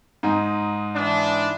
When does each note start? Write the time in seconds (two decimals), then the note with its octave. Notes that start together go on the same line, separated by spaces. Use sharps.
0.23 G#2 D#4
0.95 E3 D4